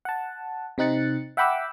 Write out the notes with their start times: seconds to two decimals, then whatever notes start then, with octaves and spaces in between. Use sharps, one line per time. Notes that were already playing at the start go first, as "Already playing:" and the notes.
0.05 F#5 A5
0.78 C3 C4 D#4 F#6 A6 C#7
1.37 E5 F#5 G5 B5 D6 E6